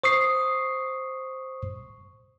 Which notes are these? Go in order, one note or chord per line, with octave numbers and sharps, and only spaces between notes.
C5 C#6 D#6 C7